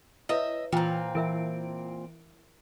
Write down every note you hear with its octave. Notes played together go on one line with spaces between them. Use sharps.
E4 B4 C#5 D#5 E5
A#2 E3 C4 F4 G5 A#5
E3 E4 A#4 E5 D7